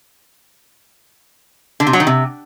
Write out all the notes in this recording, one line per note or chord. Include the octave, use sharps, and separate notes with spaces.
D3
C3
F#3
D#3
C3